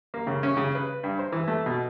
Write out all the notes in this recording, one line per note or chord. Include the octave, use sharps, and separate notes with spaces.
A#3
C#3
C#4
C#3
B4
G2
C5
E3
A3
B2